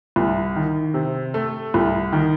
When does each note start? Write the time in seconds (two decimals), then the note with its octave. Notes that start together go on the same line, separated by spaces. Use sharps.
0.16 C2
0.56 D#3
0.94 C3
1.34 A3
1.74 C2
2.12 D#3